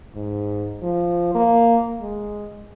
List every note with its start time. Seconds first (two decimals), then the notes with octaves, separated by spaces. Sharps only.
0.15 G#2
0.82 F3
1.34 A#3
2.01 G#3